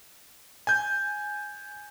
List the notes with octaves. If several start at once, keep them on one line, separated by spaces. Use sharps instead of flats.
G#5 G6